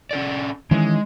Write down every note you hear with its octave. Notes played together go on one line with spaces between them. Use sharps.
C#4 A4 D5
D#3 E3 G#3 C#4